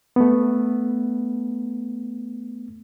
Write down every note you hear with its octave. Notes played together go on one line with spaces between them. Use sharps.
A3 B3